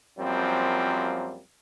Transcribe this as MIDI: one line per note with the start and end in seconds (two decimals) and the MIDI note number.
0.19 1.41 42
0.19 1.41 53
0.19 1.41 55
0.19 1.41 58
0.19 1.41 60